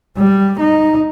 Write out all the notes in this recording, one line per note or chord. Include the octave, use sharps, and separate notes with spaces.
G3
D#4